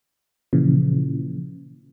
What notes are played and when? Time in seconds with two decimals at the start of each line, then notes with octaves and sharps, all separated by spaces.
0.53 A#2 C#3 E3 F3